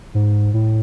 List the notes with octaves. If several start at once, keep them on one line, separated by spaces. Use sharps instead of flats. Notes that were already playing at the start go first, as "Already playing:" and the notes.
G#2
A2